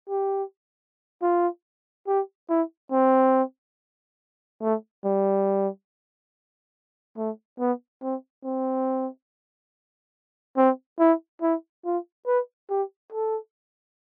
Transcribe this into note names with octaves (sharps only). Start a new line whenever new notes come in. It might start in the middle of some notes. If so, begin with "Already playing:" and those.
G4
F4
G4
E4
C4
A3
G3
A3
B3
C4
C4
C4
E4
E4
F4
B4
G4
A4